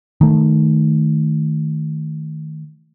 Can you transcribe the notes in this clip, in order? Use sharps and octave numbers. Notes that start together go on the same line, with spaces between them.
D#3 A3